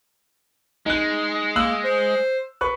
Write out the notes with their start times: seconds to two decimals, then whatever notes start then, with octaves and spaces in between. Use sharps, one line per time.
0.86 G#3 D#4 F#6
1.56 A#3 E6 F#6 F#7
1.84 C5
2.61 B4 C#6 F#6